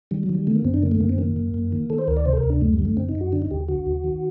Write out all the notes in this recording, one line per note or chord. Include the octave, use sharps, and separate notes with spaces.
D#3 G3
F#3
D#3
G3
D3 A3
A#3
F#2 C4
D4
D3 A#3
A3
F#2 A#3
C4
D#3 A#3
F#2
F#2
D#3
D#3 A4
C5
D2 A#4
D5
C3 C5
A4
A#4
D2
D4
F#2 A3
G3
D3
A3
F#2 C4
D#4
F#2
F#4
D3 D4
D#4
D#2 G4
D3 F#4
D#2
D#3